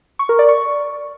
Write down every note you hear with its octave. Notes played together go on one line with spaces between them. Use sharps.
C#6
A#4
D5
C#6